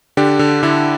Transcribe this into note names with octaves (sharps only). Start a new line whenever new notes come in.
D3 D4 G4
D3
D3 E4 A4